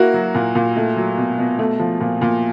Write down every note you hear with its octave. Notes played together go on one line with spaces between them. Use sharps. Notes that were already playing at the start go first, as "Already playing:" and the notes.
Already playing: A#3 E4 F#4
F#3
A#2
A#2
A3
F#3
B2
B2
A3
F3
A#2
A#2